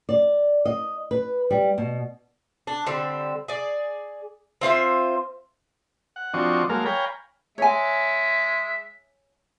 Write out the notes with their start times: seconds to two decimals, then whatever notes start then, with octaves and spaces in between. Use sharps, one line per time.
0.09 D5
0.65 D#5
1.11 B4
1.51 G3
1.78 B2
2.67 D4
2.87 D3 G3 C4
3.48 G#4 D5
4.61 C4 F4 C5 E5
6.16 F#5
6.34 F3 C4 D4 F#4 D#5 C#6
6.69 F#3 G#3 A#3 A4 A#4 F5
6.85 C#5 F5 G5 G#5 A#5 B5
7.58 G#3 C#5 E5 G#5